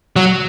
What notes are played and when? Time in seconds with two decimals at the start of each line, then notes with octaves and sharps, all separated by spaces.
0.16 F#3